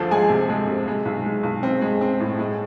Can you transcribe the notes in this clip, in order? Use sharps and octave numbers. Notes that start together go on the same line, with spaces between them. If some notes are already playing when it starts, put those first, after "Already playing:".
Already playing: D2 F3 A4 A5
G#3 G#4 G#5
C3
G#3
C3
G#3
B1
G#3
B1
C4
G#3
C4
A2
G#3